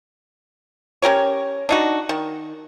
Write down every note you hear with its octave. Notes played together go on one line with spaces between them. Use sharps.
C#4 G4 A#4 C#5
D4 D#4 F#4
D#3